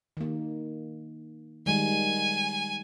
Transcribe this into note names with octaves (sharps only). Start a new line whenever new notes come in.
D#3 A#3
D#3 G3 G#3 G#5